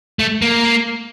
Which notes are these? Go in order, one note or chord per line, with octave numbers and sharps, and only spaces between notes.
A3
A#3